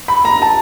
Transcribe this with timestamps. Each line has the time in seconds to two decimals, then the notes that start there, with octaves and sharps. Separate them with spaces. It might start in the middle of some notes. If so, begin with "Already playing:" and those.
0.08 B5
0.25 A#5
0.42 A5